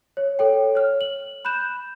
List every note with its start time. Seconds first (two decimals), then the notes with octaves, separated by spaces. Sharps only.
0.17 C#5
0.39 A4 C#5 G5
0.75 C#5 F6
1.01 F#7
1.45 B5 F#6 G6 E7